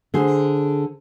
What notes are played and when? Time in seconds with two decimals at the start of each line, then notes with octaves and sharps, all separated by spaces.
0.14 D3 G#4 C5